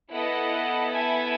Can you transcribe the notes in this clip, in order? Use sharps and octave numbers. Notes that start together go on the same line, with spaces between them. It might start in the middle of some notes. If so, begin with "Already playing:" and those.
B3 E4 A4 D#5 F#5
E5 G#5